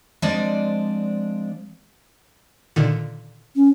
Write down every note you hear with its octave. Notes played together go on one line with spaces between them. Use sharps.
F3 G#3 C4 D4 D5 D#5
A#2 D3 D#3
C#4